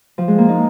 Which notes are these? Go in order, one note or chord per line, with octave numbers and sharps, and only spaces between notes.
F3
G#3
A#3
D#4